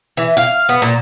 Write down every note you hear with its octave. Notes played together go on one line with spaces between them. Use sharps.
E3
F5
B3
A#2